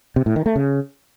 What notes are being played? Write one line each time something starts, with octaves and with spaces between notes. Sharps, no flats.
C3
A2
D#3
A3
C#3